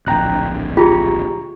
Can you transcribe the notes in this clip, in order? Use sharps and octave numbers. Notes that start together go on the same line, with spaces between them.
D1 A#1 G5 A#5 F#6
F4 G4 G#4 A#5 C#6